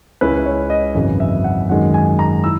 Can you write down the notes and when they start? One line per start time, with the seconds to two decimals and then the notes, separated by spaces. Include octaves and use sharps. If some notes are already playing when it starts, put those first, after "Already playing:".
0.21 C#2 C#3 G#3 C#4 E4 B4
0.46 C#5
0.70 D#5
0.95 G#1 F#2 C#3 E3
1.20 E5
1.44 F#5
1.69 F#2 D#3 G#3 F#5
1.94 G#5
2.19 A#5
2.44 E4 E6